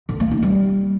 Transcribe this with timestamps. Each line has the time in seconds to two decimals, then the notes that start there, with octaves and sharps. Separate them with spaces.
0.09 D3
0.20 A#3
0.31 D#4
0.42 G3